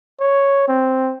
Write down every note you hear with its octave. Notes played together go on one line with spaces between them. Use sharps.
C#5
C4